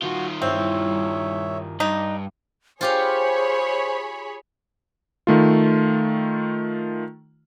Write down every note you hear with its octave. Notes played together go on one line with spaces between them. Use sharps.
D#3 F4 F#4
G2 C4 E4 C#5 E5
G2 D#4
F4 G4 G#4 C5 C#5 F5 B5
D#3 A3 F4